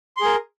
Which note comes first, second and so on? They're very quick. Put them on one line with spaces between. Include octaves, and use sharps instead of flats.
C6 G#4 A#4